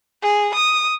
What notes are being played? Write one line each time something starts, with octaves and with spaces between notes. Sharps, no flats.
G#4
D#6